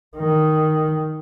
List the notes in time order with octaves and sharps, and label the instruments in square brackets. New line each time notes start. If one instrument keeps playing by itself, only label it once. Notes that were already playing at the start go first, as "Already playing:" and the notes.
[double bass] D#3